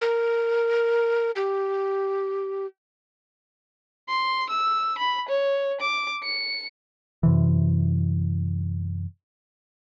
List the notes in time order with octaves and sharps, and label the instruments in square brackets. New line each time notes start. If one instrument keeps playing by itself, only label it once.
[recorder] A#4
G4
[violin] C6
E6
B5
C#5
D6
C#7
[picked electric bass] F#2 C3 E3